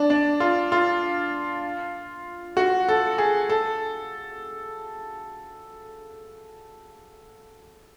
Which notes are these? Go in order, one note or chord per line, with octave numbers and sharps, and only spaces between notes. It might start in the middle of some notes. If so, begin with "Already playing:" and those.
Already playing: D4
D4
F4
F4
F#4
A4
G#4
A4